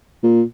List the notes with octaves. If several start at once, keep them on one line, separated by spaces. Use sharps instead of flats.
A#2